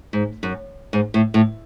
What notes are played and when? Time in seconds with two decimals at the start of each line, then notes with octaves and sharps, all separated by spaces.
0.13 G#2
0.43 F#2
0.93 G#2
1.14 A2
1.34 A2